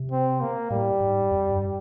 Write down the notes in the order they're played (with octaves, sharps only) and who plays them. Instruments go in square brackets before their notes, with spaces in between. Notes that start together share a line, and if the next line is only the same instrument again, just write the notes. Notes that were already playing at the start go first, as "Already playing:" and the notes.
Already playing: [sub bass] C3
[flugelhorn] C4
A#3
[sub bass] A2 [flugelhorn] G3
[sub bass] G#2
F2
G2